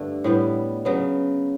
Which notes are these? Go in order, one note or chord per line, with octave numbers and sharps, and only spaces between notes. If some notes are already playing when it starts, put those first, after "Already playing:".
Already playing: G2 D3 A3
A2 G3 B3
C#3 F#3 B3